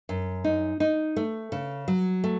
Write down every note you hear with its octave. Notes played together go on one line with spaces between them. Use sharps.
F#2
D#4
D#4
A3
C#3
F#3
A3